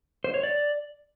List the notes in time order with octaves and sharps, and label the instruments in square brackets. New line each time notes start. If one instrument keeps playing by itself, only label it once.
[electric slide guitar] C5
C#5
D5